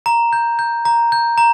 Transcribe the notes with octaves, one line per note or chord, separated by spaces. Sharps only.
A#5
G6
G6
A#5
G6
A#5